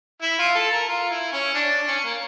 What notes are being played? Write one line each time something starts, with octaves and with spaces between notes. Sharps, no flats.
E4
F4
A4
A#4
F4
E4
C#4
D4
D4
C#4
A#3